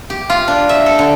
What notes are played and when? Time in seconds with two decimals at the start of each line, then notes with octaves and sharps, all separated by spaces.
0.10 G4
0.30 F4
0.48 D4
0.69 E5
0.86 A4
0.99 D3